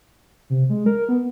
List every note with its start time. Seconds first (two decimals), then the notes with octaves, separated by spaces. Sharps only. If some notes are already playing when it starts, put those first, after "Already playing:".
0.50 C3
0.70 G#3
0.86 A#4
1.09 B3